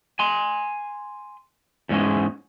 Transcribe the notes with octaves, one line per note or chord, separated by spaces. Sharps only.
G#5 C6
E2 G#2 G#3 C#4